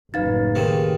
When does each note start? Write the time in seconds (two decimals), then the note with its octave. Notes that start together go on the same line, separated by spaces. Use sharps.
0.14 F#1 F#2 A2 D#4 B4 F5 A6
0.55 C3 D#3 G#4 A#4